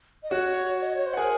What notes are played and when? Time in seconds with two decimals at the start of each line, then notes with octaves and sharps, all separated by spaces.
0.23 D#5
0.31 F#4 C#5 F#5
0.82 D#5
0.94 C#5
1.06 C5
1.13 F#5
1.17 G#4 A#4 G#5